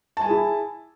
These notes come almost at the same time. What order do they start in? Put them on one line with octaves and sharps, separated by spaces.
A5 G#5 G#4 E4